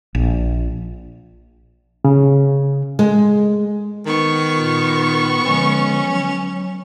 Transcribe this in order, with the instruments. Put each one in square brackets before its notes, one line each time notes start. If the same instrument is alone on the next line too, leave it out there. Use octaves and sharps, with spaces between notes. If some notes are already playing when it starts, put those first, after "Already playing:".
[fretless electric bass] A#1
[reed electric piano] C#3
[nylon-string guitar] G#3
[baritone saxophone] D#3 [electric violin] B3 C#6
[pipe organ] A#2 F4
[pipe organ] D3 F3 G#3 [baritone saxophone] C#4
[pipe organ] F#3